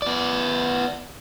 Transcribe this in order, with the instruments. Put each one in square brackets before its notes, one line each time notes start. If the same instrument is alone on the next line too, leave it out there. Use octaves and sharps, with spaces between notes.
[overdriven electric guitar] B3 D5